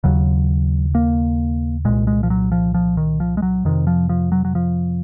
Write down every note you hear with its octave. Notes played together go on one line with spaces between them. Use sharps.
D#2 C#3 F#3
A#3
C2 A#2 G#3
G#3
F3
F#3
F3
F3
D#3
F3
G#3
F#3
F2 C3 D#3
F3
F3
F#3
F#3
F3